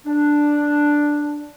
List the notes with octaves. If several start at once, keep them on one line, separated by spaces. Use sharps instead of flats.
D4